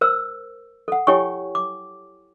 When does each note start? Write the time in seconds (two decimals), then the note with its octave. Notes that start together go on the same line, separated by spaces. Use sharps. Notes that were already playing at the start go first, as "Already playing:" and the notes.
0.01 A#4 C5 E6
0.88 A4 F#5
1.07 E4 G4 C#5 G5 G#5 C#6
1.55 D6